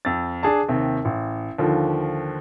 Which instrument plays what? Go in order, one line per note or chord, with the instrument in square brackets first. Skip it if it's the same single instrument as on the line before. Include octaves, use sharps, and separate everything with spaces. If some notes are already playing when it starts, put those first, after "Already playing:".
[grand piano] F2 A6
D4 G#4 A5
D#2 C3
A1
D#2 D3 F3